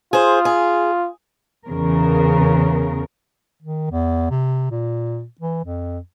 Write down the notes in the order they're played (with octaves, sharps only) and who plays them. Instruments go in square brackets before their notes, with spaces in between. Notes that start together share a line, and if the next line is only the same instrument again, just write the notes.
[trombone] F4 [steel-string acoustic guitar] G#4 C5
[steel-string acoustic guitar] G#4
[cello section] E2 C#3 A#4
[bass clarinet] D#3
E2
C3
A#2
E3
F2